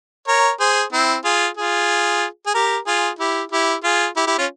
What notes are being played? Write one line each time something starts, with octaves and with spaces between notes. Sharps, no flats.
A#4 C#5
G#4 C5
C4 E4
F4 G#4
F4 G#4
G#4
G4 A#4
F4 G#4
E4 G4
E4 G4
F4 G#4
E4 G4
E4 G4
C#4 F4